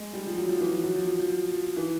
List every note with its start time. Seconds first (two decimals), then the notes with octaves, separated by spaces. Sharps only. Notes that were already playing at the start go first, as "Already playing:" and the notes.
Already playing: G#3
0.13 G3
0.26 F3
0.37 F#3
0.48 F3
0.60 E3
0.72 F3
0.83 F#3
0.95 F3
1.06 F#3
1.19 F3
1.30 F3
1.53 F3
1.76 E3